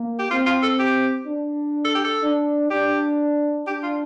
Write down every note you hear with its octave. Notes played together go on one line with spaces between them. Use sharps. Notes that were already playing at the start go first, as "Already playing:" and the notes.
Already playing: A#3
G4
C4 F4
F4
A4
G4
D4
A4
G4
A4
D4
D4 G4
D4 G4
F4